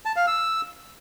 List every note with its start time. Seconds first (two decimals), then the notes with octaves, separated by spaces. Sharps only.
0.05 A5
0.16 F5
0.27 E6